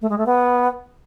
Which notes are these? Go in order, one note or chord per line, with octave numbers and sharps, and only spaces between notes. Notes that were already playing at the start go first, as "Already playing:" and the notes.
A3
G#3
A3
B3